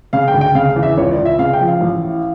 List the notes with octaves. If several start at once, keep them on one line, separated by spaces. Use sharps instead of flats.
C#3 F5
G5
D2
G5
C#3 F5
F5
E2
E5
C#2 C#5
D5
C#2
E5
C#3 F5
G5
F3
F5
A1
A2